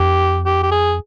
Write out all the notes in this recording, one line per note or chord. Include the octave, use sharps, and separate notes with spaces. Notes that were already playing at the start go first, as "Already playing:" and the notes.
Already playing: F2 G4
G4
G4
G#4